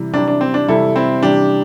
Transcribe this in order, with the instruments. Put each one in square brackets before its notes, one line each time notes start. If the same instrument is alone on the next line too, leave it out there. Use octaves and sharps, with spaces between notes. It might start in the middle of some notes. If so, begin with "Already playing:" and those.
Already playing: [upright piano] C3 E3 G3
[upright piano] C3 E3 G3 [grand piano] D4
[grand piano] D4
C4
D4
[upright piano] C3 E3 G3 [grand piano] E4 A4
[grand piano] C4 E4
[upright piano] C3 E3 G3 [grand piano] D4 G4